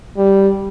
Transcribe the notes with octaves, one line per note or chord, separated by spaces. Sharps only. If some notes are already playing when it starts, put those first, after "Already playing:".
G3